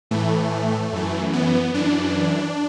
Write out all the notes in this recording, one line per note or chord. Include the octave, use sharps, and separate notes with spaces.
A2 E3 A3
F#2 E3
B3
F#2 E3 D4